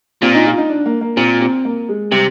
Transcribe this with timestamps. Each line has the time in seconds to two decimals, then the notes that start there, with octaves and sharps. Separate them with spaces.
0.22 A#2 C4
0.35 D#4
0.46 F4
0.58 D#4
0.69 D4
0.86 A#3
1.01 A#3
1.17 A#2 C4
1.41 C4
1.65 A#3
1.89 G#3
2.11 C3 G3